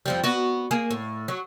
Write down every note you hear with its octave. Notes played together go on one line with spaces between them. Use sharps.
F2 F3 G3
B3 F#4
A#3 G#4
A2
F#3